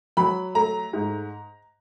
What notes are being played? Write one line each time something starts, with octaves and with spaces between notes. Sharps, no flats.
F#3 B5
A3 A#5
G#2